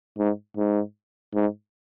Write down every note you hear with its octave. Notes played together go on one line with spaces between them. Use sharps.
G#2
G#2
G#2